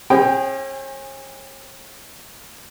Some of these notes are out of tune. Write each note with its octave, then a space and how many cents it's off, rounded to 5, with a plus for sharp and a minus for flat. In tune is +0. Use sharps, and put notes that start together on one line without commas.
C#4 -45 G#4 -25 G5 +0